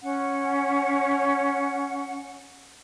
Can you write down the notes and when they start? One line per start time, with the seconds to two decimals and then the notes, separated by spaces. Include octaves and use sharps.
0.01 C#4 F#5